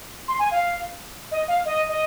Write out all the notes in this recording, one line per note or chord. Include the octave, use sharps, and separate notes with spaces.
C6
G#5
F5
D#5
F5
D#5
D#5